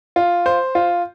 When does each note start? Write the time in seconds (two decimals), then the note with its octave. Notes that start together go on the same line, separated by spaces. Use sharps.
0.16 F4
0.46 C5
0.75 F4